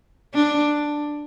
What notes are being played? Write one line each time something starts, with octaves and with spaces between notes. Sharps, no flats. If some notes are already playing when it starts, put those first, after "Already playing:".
D4